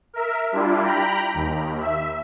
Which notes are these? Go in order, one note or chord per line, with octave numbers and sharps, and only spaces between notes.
A#4 E5
G3 D4 E4 F4
G5 A#5 B5
D#2
E5